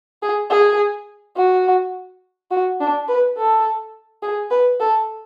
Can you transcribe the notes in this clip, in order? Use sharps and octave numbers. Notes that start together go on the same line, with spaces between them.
G#4
G#4
F#4
F#4
D4
B4
A4
G#4
B4
A4